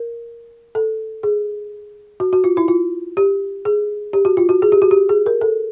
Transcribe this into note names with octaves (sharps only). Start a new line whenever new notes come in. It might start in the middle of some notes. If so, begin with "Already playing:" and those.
Already playing: A#4
A4
G#4
F#4
F#4
F4
E4
F4
G4
G#4
G4
F#4
F4
F#4
G#4
G4
F#4
G4
G#4
A#4
A4